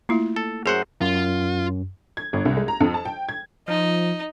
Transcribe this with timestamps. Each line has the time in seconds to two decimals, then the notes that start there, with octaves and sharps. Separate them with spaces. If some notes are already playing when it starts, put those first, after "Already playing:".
0.09 A3 A#3 E4 F4
0.36 A4
0.66 F#2 G#4 C5 F#5
1.01 F#2 F4
2.17 G#6
2.33 G1
2.45 C2
2.57 G#3
2.68 A#5
2.81 F2
2.94 A5
3.05 G5
3.29 G#6
3.68 F3 D#4